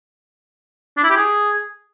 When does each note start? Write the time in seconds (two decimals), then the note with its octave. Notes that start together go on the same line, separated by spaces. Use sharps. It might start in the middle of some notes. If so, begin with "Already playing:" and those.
0.97 D4
1.04 E4
1.10 G4
1.16 G#4